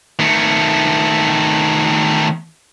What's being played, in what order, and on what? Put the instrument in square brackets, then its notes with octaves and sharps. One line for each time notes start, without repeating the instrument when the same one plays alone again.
[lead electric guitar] D#3 A3